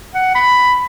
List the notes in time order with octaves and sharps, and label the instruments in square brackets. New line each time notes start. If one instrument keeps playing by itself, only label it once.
[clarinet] F#5
B5